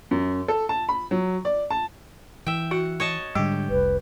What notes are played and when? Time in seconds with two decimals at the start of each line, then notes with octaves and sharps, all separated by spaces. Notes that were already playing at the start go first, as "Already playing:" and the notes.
0.11 F#2
0.48 A4
0.69 A5
0.89 B5
1.11 F#3
1.45 D5
1.71 A5
2.46 E3 E5 G5
2.71 F#4 F#5
3.00 C#5 D#5 A5
3.35 G#2 D3 G3 G4
3.70 F1 C2 B4